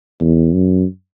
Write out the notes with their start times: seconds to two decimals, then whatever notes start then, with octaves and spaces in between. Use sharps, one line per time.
0.20 E2
0.54 F#2